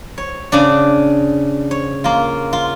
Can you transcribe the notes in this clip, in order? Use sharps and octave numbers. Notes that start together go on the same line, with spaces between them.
C#5
C#3 D4
C#5
A#3 F4
F4